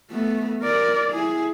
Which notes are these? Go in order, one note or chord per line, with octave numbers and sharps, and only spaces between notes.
A3 B3
A#4 D5
E4 G#4